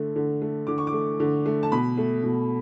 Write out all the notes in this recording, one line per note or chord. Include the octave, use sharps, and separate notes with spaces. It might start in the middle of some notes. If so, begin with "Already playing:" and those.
Already playing: D3 A3
D3
A3
D3 D6
C#6
D6
A3
D3
A3
A5
B2 B5
A3
B2